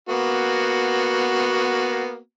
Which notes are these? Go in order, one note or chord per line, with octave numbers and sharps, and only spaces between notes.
A#3 B3 F#4